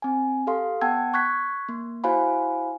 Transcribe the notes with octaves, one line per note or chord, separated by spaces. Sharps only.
C4 G#5
G4 A4 F5 C6
B3 F#5 G5 A5 E6 G#6
C#6 F#6 G#6 B6
A#3
E4 F#4 C5 F5 G#5 B5